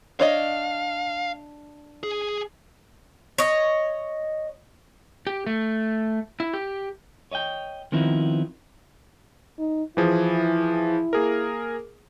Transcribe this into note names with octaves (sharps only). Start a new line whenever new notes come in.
D4 C#5 D#5 F5
G#4
C#5 D#5
G4
A3
E4
G4
C#5 D#5 E5 G5
D#3 F3 B3 C4 D#4 E4
D#4
E3 F3 E4 G#4
A#3 G#4 A#4